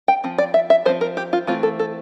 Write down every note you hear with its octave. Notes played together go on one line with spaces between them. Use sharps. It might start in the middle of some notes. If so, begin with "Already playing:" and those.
G5
F3 C4
D5
E5
E5
F3 C4 C5
A#4
G4
F4
E3 A3 C4 F4
A4
A4